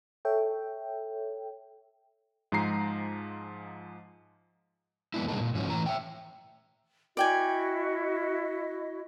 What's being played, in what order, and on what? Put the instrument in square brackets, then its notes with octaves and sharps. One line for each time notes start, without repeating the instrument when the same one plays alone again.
[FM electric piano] A4 C#5 E5 G5
[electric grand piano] G#2 F3 G#3 A#5 C7
[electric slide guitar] F2 D#3 G#3 B3 D4 E4
C3 G3 G#3 A#3 D#4 A4
A#2
G#2 D3 F3 F#3 C#4
A2 E3 A#5
E5 G5
[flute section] E4 F#4 D#5 [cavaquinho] D5 G5 G#5